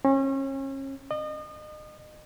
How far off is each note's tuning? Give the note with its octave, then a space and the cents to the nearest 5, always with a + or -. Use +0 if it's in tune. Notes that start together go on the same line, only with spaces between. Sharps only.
C#4 -35
D#5 -35